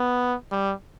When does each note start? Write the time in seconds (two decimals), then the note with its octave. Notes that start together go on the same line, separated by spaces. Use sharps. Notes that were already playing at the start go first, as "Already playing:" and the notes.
Already playing: B3
0.52 G3